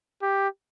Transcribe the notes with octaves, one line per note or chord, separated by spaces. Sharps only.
G4